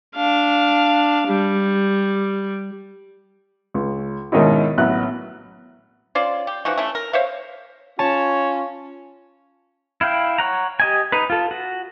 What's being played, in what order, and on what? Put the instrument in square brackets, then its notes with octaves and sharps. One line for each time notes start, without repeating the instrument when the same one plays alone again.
[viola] D4 F5
G3
[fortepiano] C#2
G#2 B2 D#3 C#4 D#4 E4
A1 F#3 B3 F#6
[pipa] C#4 F4 C5 D5
G4
E3 F3 D#4 F#4
A3 C#4 E4
A#4
C5 C#5 E5 F5
[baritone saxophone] C#4 [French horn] F4 [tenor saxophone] C#5 [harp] A5
[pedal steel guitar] E4 F5 G5
C#5 F#5 A#5
G4 D#5 G#5
D#4 B4
F4 A4
F#4